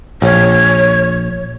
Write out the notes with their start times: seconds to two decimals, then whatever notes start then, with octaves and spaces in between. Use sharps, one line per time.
0.22 A#1 C#5